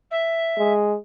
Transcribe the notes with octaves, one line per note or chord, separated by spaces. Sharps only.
E5
G#3